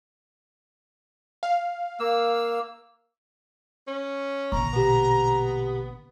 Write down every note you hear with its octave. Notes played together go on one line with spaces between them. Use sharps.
F5
A#3 E6
C#4
A#1 D3 A#5 C#6
B2 B3 G4